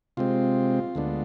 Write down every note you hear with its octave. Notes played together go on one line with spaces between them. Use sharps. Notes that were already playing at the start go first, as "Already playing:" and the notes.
C3 G#3 C4 F4
D2 D3 G#3 B3 D4